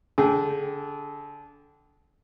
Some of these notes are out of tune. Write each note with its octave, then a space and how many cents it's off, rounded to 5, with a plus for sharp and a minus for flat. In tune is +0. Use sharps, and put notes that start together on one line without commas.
D3 -25 G#4 +0 G5 -15